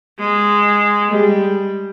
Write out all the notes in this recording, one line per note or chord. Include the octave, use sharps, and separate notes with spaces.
G#3
G3 G#3